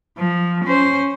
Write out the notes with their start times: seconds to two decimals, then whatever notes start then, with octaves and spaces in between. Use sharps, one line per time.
0.18 F3
0.65 C#4 C5